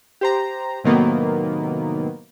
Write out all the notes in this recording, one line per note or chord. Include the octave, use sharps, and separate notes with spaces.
G4 C5 A#5
A2 C3 D#3 F#3 A#3 B3